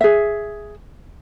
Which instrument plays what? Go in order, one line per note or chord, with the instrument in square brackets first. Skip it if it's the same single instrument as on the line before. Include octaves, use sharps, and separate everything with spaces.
[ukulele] G#4 E5